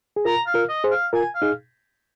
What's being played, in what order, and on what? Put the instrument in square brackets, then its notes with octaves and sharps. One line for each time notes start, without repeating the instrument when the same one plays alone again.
[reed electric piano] G#4
[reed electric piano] F4 A#4 [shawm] A#5
[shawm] F5
[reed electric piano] F4 A#4
[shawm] D#5
[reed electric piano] G#4 C5
[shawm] F5
[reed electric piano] F4 A#4 [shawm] G#5
[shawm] F5
[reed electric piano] D#4 G#4